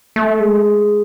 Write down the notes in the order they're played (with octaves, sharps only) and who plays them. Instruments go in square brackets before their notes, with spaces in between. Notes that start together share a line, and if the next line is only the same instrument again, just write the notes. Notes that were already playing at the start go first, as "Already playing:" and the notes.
[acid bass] A3
G#3